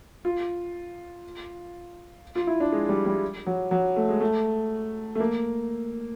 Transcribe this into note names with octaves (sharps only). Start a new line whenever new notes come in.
F4
F4
E4
D4
G#3
G3
G3
F#3
F#3
A3
G#3
A3
A3
A#3